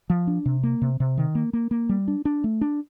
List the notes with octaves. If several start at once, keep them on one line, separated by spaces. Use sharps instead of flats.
F3
D4
C3
A#3
C3
C3
D#3
A#3
A#3
A#3
G3
D4
D4
A3
D4